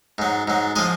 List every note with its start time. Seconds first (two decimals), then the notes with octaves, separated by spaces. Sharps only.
0.18 G#2 F#3
0.48 G#2 F#3
0.76 F3 G#3 D#5